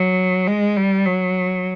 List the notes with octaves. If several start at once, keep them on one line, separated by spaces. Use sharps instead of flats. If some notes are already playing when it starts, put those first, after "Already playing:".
Already playing: F#3
G#3
G3
F#3